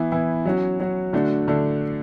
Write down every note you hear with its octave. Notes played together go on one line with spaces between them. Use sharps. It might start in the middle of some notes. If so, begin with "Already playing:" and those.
Already playing: E3 B3 E4
E3 B3 E4
F#3 C#4 F#4
F#3 C#4 F#4
D3 A3 D4 F#4
D3 A3 D4